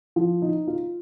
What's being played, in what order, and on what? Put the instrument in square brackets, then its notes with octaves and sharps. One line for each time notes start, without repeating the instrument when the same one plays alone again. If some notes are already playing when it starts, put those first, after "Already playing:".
[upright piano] F3
D#4
F4